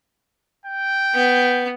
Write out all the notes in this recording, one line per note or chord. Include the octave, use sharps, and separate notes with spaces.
G5
B3